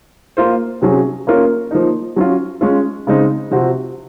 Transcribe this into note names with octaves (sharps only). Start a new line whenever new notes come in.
A#3 F4 C5
C3 F#3 C#4 G#4
A#3 C#4 F4 A#4 C#5
F3 A#3 D#4
F#3 C#4 F4
G#3 C#4 F4
C#3 G#3 C4 D#4
C3 F3 C4 F#4